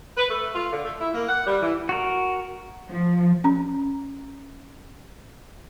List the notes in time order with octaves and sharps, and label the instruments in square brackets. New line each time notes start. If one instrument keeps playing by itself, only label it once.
[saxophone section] B4
A3
F4
D3
A3
E4
A#3
F#5
G3
E3
[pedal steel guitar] F#4 A#4
[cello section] F3
[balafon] C#4 A#5